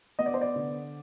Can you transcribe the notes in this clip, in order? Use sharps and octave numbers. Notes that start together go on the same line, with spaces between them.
B3 D#5
D5
C5
D5
D3